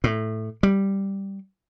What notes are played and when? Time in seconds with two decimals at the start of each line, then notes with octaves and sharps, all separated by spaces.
0.04 A2
0.63 G3